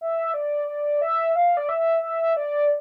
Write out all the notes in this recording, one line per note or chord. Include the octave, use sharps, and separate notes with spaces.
E5
D5
D5
E5
F5
D5
E5
E5
D5